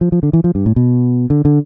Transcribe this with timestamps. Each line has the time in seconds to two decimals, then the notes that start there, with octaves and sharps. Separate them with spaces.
0.01 F3
0.12 F3
0.23 D3
0.33 E3
0.44 F3
0.55 G2
0.66 A2
0.76 B2
1.30 D3
1.45 D3